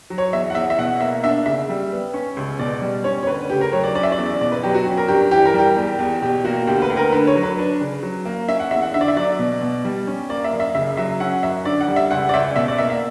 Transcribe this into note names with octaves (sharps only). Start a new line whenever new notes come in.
F#3
C#5
E2 E5
F#5
E2 E5
E5
B2 F#5
A#3 E5
D4 E5
C#3 E5
G3
B3
C#4
C#2
B2 D5
G3
C#4 C#5
C#5
D2 B4
C#3 G4
A#4
F#3 C#5
D5
C#4 D5
E5
D5
E2
B2 D5
B4
F#3 G4
F#4
C#4
A#4
G2 G4
E3 G4
A#4
G3 G4
E2
E2
B2 G4
A#3 F#4
D2 G4
B4
D2
A#4
D3 B4
C#5
F#3
B4
D4
C#3
F#3
A#3
C#4 E5
F#5
E2 E5
F#5
D3 E5
D5
E5
F#3 D5
B2
B2
G3
C#4
A#3 D5
E5
F#2
E5
C#3 E5
F#3 E5
C#4 F#5
F#2 E5
D3 D5
F#5
G3
E5
C#2 F#5
D5
C#2 E5
B2 E5
D5
A#3 E5
E5